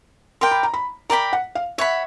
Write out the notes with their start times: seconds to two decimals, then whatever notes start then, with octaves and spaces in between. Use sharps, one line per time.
0.41 A#4 D5 G5 C6
0.51 B5
0.63 A#5
0.74 B5
1.10 A#4 D5 G5 A#5 B5
1.33 F#5
1.55 F5
1.78 C#5 E5 F#5 B5